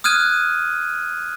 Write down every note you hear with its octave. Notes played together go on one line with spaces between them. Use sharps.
D#6 F6 F#6 G#6 D#7